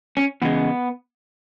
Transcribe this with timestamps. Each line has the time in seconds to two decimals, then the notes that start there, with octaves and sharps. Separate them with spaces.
0.17 C#4
0.42 E2 C#3 G#3 B3